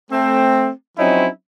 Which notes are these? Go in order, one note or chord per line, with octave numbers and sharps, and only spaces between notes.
A3 C4
F3 F#3 C4 C#4 D#4 E4